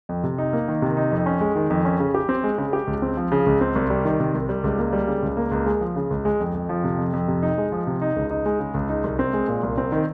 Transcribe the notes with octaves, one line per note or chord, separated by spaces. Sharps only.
F2
C3
D#4
A#3
D#3
C3
D#4
F2
C#4
G#3
D#3
F2
C#4
C#3
G4
C4
G#3
C#3
G4
C#2
C4
F3
C#3
C#2
C4
C2
G3
D#3
C3
C2
G3
C#2
A#3
G3
C#3
C#2
A#3
C#2
G#3
F3
C#3
C#2
G#3
F2
F2
F3
C3
F2
F2
C3
D#4
G#3
F3
C3
D#4
C#2
D#4
G#3
C#3
C#2
D#4
C2
C4
G#3
A#2
C2
C4
D#3